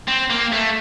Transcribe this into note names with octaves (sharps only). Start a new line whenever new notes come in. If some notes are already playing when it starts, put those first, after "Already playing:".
C4
A#3
A3